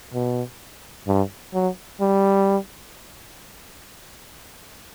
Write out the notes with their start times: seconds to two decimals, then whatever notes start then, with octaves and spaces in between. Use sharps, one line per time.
0.14 B2
1.08 G2
1.54 F#3
2.01 G3